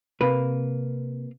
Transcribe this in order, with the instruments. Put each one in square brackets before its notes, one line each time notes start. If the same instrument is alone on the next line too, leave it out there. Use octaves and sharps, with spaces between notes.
[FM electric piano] C3 [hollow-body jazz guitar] A#3 B4